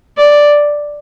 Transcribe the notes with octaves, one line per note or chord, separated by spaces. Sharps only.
D5